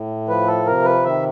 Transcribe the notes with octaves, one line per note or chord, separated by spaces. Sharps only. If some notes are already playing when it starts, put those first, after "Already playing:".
Already playing: A2
F3 B4
A4
C3 A#4
B4
D#3 E5